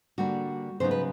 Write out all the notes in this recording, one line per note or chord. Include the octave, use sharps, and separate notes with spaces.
D3 G3 A#3 D4 F#4
C#3 F#3 B3 D#4 C5
B4